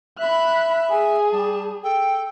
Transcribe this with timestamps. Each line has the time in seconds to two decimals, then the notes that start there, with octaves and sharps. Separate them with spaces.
0.19 E5 B5 F#6
0.90 G#4 G#5
1.32 G3 A5
1.84 A4 G5